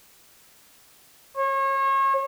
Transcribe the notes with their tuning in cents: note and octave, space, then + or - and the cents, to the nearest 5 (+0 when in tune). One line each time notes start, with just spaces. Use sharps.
C#5 -35